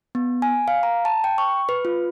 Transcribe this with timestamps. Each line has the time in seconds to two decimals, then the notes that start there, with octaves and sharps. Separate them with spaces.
0.15 B3
0.42 G#5
0.68 F5
0.83 A#5
1.05 A5
1.24 G5
1.38 C#6
1.69 B4
1.85 F4